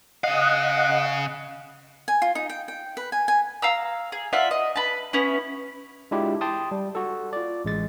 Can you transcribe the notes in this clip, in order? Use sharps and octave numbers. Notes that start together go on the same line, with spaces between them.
C#3 D#5 F5 F#5
G#5
F4
D#4
G5
G5
B4
G#5
G#5
F5 A#5 E6
G#4
F4 D5 E5 F#5
D#5
B4 A5
B3 C#4 E4
G#3 D4 E4 F4 G4
G5 A5 C6 D#6
G3
F#4 A4
F4 D5
A1 G#3 A6